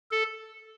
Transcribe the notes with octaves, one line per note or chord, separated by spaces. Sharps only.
A4